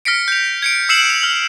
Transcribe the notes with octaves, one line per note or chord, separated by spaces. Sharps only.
F6 A#6 B6 C#7 D7
G6 F7
G#6 C#7 D7
E6 C7 C#7 E7 F#7
F7
F6